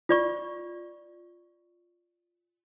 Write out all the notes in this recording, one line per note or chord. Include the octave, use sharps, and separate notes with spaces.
F4 D5 C#6